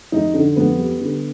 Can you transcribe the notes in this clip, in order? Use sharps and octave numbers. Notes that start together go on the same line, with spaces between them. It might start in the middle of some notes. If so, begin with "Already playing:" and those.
F2 D#4
D3 D4
F2 B3
G3
D3